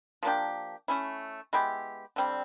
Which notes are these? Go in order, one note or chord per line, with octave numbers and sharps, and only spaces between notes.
F3 A#3 D4 G4
A3 C#4 E4
G#3 B3 E4 G4
D3 G3 C4